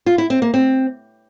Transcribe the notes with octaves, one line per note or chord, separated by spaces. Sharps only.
F4
E4
C4
A#3
C4